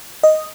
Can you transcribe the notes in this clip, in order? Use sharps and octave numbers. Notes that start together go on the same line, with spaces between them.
D#5